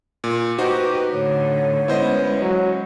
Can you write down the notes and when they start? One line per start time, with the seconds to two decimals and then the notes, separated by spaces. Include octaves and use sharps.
0.24 A#2
0.58 D#4 F#4 G4 B4 C5 D#5
1.11 A2 D3 C#5
1.88 G#3 B3 C#4 E4 C5 D#5
2.42 F#3